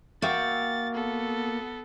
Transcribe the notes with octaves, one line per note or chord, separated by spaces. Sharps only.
A#3 F#4 E5 G5 A6
B3 A4